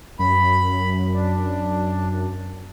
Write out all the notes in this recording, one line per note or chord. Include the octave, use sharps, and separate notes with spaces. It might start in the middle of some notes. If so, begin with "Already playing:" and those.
F#2 B5
D4